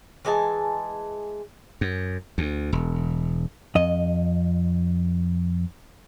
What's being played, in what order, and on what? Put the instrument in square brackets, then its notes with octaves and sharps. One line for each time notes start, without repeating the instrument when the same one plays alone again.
[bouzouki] E3 G#3 G#5 A5
[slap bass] F#2
D2
E1
[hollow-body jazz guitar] F2 D#5